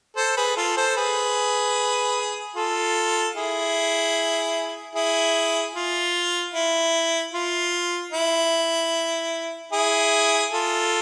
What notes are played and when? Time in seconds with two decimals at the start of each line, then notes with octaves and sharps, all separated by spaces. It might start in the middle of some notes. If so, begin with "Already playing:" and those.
0.17 A4 C5
0.37 G#4 B4
0.56 F4 A4
0.77 A4 C5
0.97 G#4 B4
2.55 F4 A4
3.35 E4 G#4
4.95 E4 G#4
5.75 F4
6.54 E4
7.34 F4
8.12 E4
9.72 E4 G#4
10.52 F4 A4